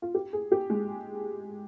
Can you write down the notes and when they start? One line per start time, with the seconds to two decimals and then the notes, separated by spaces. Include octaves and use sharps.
0.02 F4
0.15 G4
0.33 G#4
0.52 G4
0.70 G#3